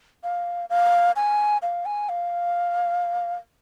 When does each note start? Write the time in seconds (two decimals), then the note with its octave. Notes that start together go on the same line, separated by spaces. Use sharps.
0.24 F5
0.70 F5
1.16 G#5
1.62 F5
1.86 G#5
2.09 F5